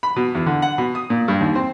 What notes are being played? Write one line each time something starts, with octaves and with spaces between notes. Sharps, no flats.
B5
B2
E2
D3
F#5
B2
D#6
A#2
G2
D#2
C4